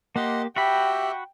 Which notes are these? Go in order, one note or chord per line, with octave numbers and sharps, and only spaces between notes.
A#3 G4 D#5 F#5 C6
F#4 G4 E5 G5 B5